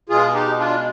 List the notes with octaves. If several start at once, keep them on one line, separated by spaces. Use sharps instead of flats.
B2 G#3 F4 G#4
D#4 G4
D4 F4